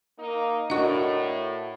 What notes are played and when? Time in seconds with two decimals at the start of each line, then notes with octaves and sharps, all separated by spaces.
0.18 A#3 D#4
0.70 A2 D4 F#4 A#4 D#5 C#6